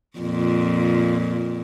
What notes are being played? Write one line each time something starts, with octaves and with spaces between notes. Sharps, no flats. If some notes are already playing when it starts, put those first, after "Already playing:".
F2 A#2